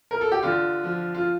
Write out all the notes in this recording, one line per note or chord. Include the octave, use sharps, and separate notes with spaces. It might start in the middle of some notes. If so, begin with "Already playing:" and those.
A#4
A4
G4
D3 F4
F3
F4